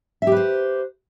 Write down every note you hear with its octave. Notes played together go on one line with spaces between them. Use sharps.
G4 B4 C5 E5